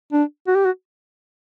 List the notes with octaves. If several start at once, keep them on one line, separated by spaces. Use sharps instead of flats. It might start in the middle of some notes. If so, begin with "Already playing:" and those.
D4
F#4
G4
F#4